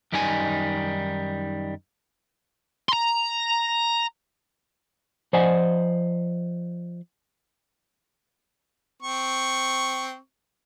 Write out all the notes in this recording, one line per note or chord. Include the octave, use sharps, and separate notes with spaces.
F#2 D#3 G3 D#4 F4 G#5
A#5 C6
F3 C5 D5 D#5 F#5 G#5
C4 C#6